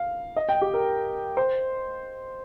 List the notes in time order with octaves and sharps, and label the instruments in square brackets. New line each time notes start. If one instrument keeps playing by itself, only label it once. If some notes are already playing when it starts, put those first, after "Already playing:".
Already playing: [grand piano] F5
D#5
G5
G4
A#4
C5